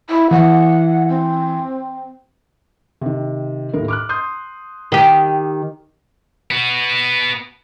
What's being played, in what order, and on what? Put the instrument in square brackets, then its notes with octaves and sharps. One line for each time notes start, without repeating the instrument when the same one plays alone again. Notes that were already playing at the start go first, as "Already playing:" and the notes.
[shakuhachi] E4
[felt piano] E3 [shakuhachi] F#5
[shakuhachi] C4
[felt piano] C3 D#3
D#2 A2 A#4
D6 F6 F#6
C6 D#6 G6
[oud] D#3 G4
[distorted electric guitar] B3 F#4